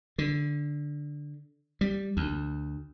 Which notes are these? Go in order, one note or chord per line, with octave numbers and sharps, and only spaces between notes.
D3
G3
D2